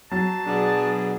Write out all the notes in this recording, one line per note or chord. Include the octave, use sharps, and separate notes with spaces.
F#3 A5
B2 D4 G#4